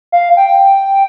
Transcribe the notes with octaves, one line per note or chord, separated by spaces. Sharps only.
F5
G5